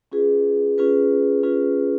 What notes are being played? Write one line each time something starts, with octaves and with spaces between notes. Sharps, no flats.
C#4 F4 G#4 B4
C#4 F4 G#4 B4
C#4 F4 G#4 B4